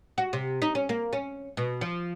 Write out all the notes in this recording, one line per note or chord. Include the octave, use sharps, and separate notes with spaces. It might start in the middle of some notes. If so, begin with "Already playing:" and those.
F#4
C3
D#4
C#4
A#3
C#4
B2
F3